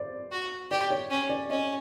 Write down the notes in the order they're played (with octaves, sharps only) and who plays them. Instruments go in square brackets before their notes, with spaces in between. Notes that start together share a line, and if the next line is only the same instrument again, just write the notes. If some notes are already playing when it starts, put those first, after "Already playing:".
Already playing: [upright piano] C5 D5
[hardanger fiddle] F#4
[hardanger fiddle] G4 [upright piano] D5
[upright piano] C#5
[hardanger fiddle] C#4
[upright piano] D5
[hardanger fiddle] C#4 [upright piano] D#5